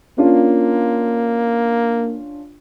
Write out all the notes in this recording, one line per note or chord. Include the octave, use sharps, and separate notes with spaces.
A#3 C#4 D4 F4